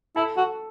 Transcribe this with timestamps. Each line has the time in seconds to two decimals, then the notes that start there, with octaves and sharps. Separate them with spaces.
0.16 E4 A4
0.37 F#4 A4